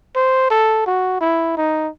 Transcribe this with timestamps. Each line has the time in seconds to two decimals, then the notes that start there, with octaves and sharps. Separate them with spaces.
0.16 C5
0.51 A4
0.86 F#4
1.21 E4
1.57 D#4